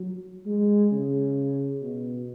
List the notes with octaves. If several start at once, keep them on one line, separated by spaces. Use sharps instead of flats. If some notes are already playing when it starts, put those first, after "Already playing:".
Already playing: F#3
G#3
C#3
B2